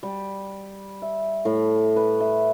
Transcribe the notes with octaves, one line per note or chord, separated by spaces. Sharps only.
G3
E5
A2
B4
E5